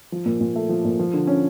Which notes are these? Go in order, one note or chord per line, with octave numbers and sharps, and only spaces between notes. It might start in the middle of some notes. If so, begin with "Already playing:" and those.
F3
A#2
A#2
A3
F3
A#2
F3
D3
C#4